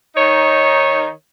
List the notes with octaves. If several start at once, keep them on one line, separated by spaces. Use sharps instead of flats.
D#3 D#4 C#5